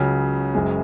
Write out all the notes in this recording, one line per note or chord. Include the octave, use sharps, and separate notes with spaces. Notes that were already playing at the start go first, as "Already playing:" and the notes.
Already playing: C#2 C#3 F#3
F#1 F#2 C#3 G#3